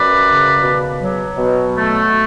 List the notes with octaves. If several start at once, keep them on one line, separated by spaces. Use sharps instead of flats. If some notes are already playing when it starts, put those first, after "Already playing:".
Already playing: F#2 B4 D5
C#3
B2
F#3
B2
A3